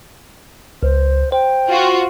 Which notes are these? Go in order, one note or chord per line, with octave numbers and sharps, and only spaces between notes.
C#2 C5
C5 G5
F4 F#4